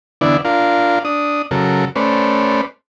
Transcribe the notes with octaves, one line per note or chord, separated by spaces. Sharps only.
D3 E3 B3 D4 E4 D5
D4 F4 A#4 F5
D4 D#6
C#3 F#3 A4 A#4
A3 C#4 B4 C5 D5